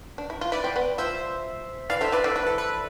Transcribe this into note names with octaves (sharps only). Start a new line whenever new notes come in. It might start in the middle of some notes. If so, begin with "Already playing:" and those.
D4
E4
F4
E4 B4 D5
C4
B3
F3 C5 E5
E3 D5 F5
D3 C5 E5
E3 B4 D5
D3 B4
E3 B4
A4
B4